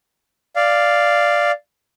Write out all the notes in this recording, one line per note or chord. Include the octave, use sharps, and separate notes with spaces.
D5 F5